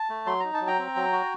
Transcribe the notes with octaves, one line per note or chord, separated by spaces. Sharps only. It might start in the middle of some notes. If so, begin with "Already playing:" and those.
Already playing: A5
A3
F#3 C6
D#4 A#5
A5
F#3
G5 A#5
C4
F#3
F#4